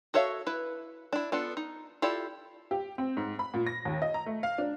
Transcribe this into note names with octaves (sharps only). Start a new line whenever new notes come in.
F#4 A4 C#5 E5 F5
E4 B4
D4 E4
B3 D4 F4 A4
D#4
E4 F4 G4 A4 D5
G4
C4
G#2
B5
A#2
A#6
D#2
D#5
A#5
A3
F5
D4